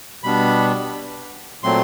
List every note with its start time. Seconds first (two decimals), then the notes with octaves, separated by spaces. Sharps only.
0.23 B2 G3 B3 D4 B5
1.63 A#2 F#3 A3 C4 C6